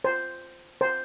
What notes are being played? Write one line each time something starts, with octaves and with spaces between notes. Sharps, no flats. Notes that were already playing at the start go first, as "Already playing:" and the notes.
C5
C5